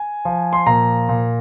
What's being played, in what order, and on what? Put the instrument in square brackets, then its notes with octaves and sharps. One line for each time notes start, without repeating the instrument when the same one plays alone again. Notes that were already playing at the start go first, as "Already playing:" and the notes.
Already playing: [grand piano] G#5
F3
C6
A#2 A#5
A#2